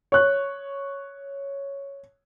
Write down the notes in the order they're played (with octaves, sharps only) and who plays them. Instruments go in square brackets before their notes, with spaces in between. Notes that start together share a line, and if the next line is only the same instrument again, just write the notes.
[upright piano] C#5 F#6